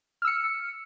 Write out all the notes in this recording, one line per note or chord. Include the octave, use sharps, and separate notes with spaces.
E6 F6 C#7